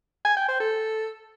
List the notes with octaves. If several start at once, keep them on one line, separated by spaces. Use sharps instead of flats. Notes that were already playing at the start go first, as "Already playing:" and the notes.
G#5
G5
C5
A4